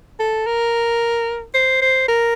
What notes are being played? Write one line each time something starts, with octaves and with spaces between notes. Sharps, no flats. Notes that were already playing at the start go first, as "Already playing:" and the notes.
A4
A#4
C5
C5
A#4